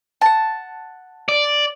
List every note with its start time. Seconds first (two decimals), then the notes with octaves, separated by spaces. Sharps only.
0.21 F#5 A5
1.29 D5